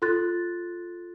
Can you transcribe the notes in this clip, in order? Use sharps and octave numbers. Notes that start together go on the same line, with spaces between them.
F4 A4 C6 F#6 A6